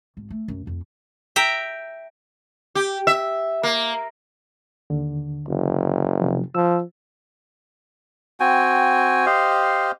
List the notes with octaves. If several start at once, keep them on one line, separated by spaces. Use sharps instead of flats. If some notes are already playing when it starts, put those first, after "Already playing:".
G#1
A3
F#2
F2
E5 G5 A#5
G4
E5
A#3
D#2 D3
F#1
C3 F3
F3 E6
C4 F#4 G5 G#5
G4 C5 D#5 F5